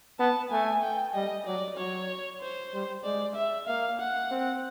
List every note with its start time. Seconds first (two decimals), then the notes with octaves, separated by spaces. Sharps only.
0.19 B3 A5
0.51 A3 G#5
0.83 G5
1.15 G3 D#5
1.46 F#3 D5
1.77 F#3 C#5
2.41 C5
2.73 G3
3.04 G#3 D5
3.35 E5
3.67 A#3 F5
4.00 F#5
4.31 C4